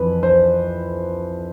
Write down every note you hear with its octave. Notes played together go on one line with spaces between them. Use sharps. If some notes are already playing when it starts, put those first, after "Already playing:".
Already playing: F2 E3 B4
C5